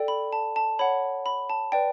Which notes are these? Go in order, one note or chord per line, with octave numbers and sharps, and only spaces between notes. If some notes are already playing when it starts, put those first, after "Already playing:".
Already playing: A4 D5 G5
B5
A5
A5
C#5 F#5 B5
B5
A5
B4 D5 G5